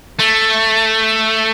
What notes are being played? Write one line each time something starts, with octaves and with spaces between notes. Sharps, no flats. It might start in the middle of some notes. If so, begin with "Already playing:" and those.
A3